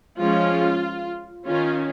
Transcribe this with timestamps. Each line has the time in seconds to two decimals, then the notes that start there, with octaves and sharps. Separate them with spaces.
0.18 F3 G#3 C#4 F4
1.47 D#3 C#4 F4